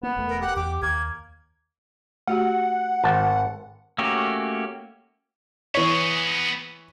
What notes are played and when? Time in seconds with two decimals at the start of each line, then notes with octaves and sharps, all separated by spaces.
0.03 A#3 B3
0.16 E1 A3
0.28 A#4
0.41 G4 F#5
0.56 E2 G4 D6
0.82 D#2 A#3 G#6
2.27 A3 F#4 G4 F#5
3.04 G#1 A5
3.98 A3 A#3 C#4 F#4 G4
5.75 E3 B3 G#4 C#5